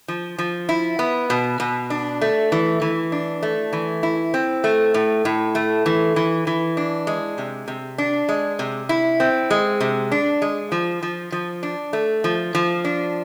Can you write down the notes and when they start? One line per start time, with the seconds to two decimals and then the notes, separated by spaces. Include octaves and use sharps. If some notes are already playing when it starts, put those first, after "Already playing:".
0.08 F3
0.38 F3
0.69 E4
0.99 B3
1.30 B2
1.60 B2
1.90 D4
2.21 A3
2.52 E3
2.82 E3
3.12 D4
3.43 A3
3.73 E3
4.03 E4
4.34 C4
4.64 A3
4.94 A2
5.25 A2
5.55 A3
5.86 E3
6.16 E3
6.47 E3
6.77 D4
7.07 G#3
7.38 C3
7.68 C3
7.98 D4
8.29 G#3
8.59 C3
8.89 E4
9.20 C4
9.50 G#3
9.80 C3
10.12 D4
10.42 G#3
10.72 F3
11.03 F3
11.32 F3
11.63 D4
11.93 A3
12.24 F3
12.55 F3
12.85 D4